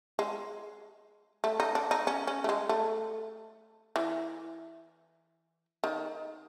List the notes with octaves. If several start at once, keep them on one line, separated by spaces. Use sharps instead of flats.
G#3
A3
D#4
D4
D#4
C#4
C#4
A3
G#3
A3
E3
D#3